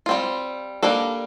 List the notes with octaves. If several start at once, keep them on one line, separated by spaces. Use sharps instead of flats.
G3 C4 F4
G3 A#3 D4 A4